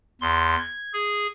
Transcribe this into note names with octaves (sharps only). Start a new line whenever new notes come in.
E2 C6
G#6
G#4